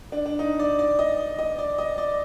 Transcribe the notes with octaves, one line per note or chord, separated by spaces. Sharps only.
D4
D4
D#4
D5
D5
D#5
D#5
D5
D#5
D5